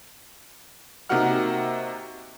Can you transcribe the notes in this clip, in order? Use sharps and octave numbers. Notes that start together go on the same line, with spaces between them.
C3 A#3 D#4 F#4 F#5 F6